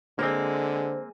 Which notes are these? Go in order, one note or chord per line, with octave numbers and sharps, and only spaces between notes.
D3 G#3 A#3 C4 C5